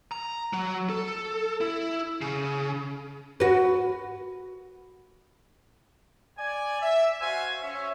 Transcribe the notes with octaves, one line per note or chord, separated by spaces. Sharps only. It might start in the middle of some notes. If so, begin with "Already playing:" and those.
A#5
F#3
A4
E4
C#3
F#4 B4
D5 G#5
E5
F#4 C5 F5 G#5
C#4 C#5 E5